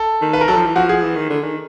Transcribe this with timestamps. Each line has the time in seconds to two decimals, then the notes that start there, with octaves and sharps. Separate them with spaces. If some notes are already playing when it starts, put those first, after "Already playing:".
Already playing: A4
0.22 D#3
0.33 B4
0.41 A#4
0.48 F#3 A4
0.56 F3
0.66 E3
0.75 F3 F#4
0.89 G#4
1.02 E3
1.15 D#3
1.30 D3
1.43 D#3